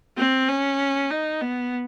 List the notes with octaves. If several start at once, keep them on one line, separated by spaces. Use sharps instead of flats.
C4
C#4
D#4
B3